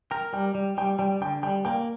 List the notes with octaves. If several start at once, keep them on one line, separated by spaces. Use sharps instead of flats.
A#4 G5
G3 G5
G3
G3 G5
G3 G5
D3 G5
G3 G5
A#3 G5